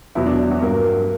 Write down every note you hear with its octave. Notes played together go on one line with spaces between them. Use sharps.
E2 B2 F#3 E4
D4
D4
F#3 F#4
G2 F#3 A#3 A#4